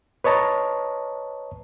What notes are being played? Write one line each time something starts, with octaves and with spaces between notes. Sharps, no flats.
B4 C#5 D#5 A5 A#5